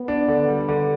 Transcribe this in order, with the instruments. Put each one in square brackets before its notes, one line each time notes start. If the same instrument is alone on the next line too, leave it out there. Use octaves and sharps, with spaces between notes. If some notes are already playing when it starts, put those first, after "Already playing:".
Already playing: [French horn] B3
[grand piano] D4
D3
G3
D3